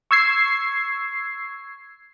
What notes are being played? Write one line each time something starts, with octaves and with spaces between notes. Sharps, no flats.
C#6 E6 G#6 C7